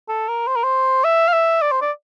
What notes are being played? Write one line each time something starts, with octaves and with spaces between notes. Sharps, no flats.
A4
A#4
C5
A#4
C5
E5
F5
E5
D5
C5
D5